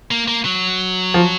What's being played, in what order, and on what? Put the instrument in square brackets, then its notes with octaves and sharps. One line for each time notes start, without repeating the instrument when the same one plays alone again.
[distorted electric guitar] A#3
A#3
F#3
[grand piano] F3